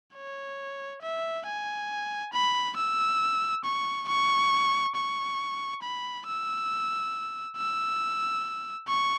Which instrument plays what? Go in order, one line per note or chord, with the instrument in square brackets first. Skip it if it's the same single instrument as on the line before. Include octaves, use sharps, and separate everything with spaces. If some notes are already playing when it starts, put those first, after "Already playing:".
[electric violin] C#5
E5
G#5
B5
E6
C#6
C#6
C#6
B5
E6
E6
C#6